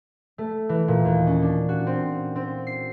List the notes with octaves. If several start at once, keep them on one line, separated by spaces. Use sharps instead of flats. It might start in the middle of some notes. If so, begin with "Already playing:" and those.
A3
E3
A#2
D#2
C#4
D4
F#4
C4
C4
C7